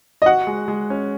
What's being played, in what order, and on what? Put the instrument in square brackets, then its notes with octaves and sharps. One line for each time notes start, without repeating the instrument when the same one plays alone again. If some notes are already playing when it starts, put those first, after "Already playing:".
[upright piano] D#5
[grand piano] F#4 [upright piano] F#5
[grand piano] G#3
G#3
C#4